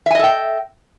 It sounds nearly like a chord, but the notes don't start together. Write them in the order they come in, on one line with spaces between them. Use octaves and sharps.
E5 G#5 D#5 A4 G5